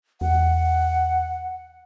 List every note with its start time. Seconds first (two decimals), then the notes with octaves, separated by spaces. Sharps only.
0.21 E2 F#5